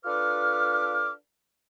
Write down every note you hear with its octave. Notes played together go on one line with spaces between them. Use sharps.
D4 F4 A4 B4 D6 F6